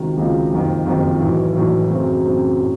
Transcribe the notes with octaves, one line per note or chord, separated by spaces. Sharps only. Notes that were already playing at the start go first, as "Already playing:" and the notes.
Already playing: C#2 C3 D#3 F#3
C#2 C3 D#3 F#3
F#1 F2 C3 D#3
F#1 F2 C3 D#3
B1 A2 E3
B1 A2 E3
F#2 C#3 F#3 A3 C4
F#2 C#3 F#3 A3 C4
A2 F#3